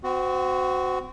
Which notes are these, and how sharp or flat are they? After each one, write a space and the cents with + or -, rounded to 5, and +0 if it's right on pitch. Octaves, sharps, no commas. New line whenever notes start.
C4 -30 F#4 +0